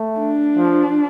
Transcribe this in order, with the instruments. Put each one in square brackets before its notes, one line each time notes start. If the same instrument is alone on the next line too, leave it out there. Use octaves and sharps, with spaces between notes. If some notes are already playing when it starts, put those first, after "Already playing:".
Already playing: [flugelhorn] A3
[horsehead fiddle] D4
[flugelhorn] F3